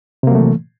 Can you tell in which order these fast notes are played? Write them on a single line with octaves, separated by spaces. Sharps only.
C3 A#3 F#3 A3 E3